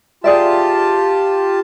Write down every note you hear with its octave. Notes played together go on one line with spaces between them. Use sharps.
F4 G4 G#4 D5 E5 A5